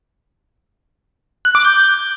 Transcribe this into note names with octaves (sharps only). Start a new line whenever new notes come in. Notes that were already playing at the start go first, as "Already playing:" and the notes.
F#6
D6
G6